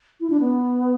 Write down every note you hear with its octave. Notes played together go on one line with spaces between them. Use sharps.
E4
D4
B3